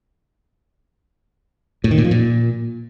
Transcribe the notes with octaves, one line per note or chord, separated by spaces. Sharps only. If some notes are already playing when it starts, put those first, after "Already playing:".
A2
D#3
A#2
F3
A#2